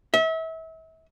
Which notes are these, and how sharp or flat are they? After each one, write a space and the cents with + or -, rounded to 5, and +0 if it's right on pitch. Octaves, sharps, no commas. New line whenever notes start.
E5 -35